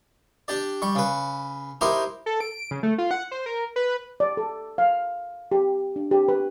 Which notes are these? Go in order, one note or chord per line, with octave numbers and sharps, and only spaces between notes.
D4 G4 D5
G3 C#6
C#3 B4
D#4 E4 G4 A#4 C5
A4
D7
C#3
A3
F4
F#5
C5
A#4
B4
D5
A4
F5
G4
D4
G4
B4